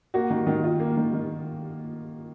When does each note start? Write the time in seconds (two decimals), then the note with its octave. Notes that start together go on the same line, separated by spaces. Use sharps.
0.14 A#3 F#4
0.30 D#3
0.46 D#3
0.63 F4
0.80 A#3
0.97 D#3
1.13 D#3